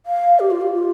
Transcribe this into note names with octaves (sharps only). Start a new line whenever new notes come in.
F5
G4
F4
G4
F4